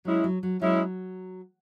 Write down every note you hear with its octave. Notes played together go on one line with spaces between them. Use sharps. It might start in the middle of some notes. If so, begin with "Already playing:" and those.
F#3 G#3 C#4 E4
F#3
F#3
F#3 G#3 C#4 E4